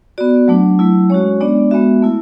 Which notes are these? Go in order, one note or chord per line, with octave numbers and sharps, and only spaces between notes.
B3 F#4 D5
F#3 A3 D4
F#3 A3 E4
G#3 C#4 F#4 C#5
G#3 B3 D4 D5
G#3 B3 F#4 E5
A3 E4